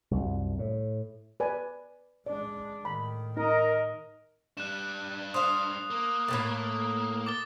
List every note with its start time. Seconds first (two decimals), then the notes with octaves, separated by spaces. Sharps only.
0.11 C2 F#2
0.59 A2
1.40 B4 D5 G#5
2.26 G#3 D4 D5
2.85 A2 D#3 B5
3.37 D#4 A#4 D#5
4.57 G3 D4 F#6 E7
5.34 C5 F5 D#6
5.90 A#3
6.28 A2 C#3 A3
7.26 D6 A6 G7